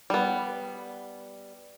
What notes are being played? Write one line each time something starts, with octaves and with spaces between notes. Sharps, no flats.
G3 B3